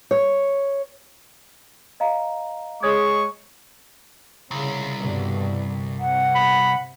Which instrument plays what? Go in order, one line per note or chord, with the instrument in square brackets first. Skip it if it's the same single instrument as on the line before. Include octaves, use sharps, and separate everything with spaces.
[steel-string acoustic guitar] C#5
[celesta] D#5 F5 A#5
[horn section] G#3 [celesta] C#5 D#6 G#6 [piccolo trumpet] C#6
[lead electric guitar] C2 [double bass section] C#3
[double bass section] G2 B2 D3
[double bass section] C3 [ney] F#5
[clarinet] B5